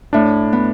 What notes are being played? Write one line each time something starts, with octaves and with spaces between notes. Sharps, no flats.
A2 D4
B3